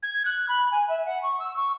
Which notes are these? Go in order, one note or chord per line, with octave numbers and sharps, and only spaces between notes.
G#6
F#6
B5
G#5
E5
F#5
C#6
E6
C#6